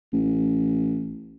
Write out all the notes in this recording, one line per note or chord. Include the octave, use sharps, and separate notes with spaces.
A1